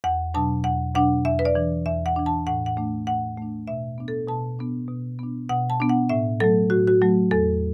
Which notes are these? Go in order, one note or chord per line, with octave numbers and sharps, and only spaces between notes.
E2 F#5
B2 F#3 D4 A5
E2 F#5
B2 F#3 D4 F#5
E2 E5
B4
D5
E3 D4
E2 E5
F#5
E3 D4
A5
A2 F#5
F#5
A3 D4
A2 F#5
A3 D4
B2 E5
B3 D4
A4
B2 A5
B3 D4
B2
B3 D4
B2 F#5
A5
B3 D4
F#5
A2 E5
F#3 A3 A4
A2 F#4
F#4
F#3 A3
E2 A4